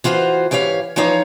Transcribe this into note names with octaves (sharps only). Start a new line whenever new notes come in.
E3 F4 F#4 A#4 C5
G#2 E3 G4 C#5 F5
E3 F3 D#4 C#5 F5